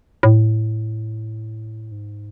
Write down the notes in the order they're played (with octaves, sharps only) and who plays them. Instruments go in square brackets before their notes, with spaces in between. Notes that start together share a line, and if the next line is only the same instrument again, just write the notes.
[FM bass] A2
G#2